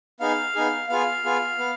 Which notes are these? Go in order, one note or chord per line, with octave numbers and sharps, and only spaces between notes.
B3 D#4 G#4 F5
B3 D#4 G#4
B3 F4 G#4 F5
B3 F4 G#4
B3